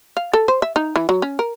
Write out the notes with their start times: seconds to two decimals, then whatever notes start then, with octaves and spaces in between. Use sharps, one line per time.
0.17 F5
0.33 A4
0.48 C5
0.62 E5
0.76 D#4
0.96 E3
1.09 F#3
1.22 C#4
1.39 A#4